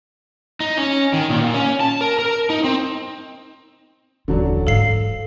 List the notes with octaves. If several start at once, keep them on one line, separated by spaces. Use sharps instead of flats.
D#4
C#4
D#3
A#2
C#4
A5
A#4
A#4
D#4
C4
D#1 D3 E3 F#3 D4
G#2 A4 F5 C7